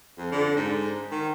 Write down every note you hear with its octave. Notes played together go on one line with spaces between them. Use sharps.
F2
D3
G#2
D#3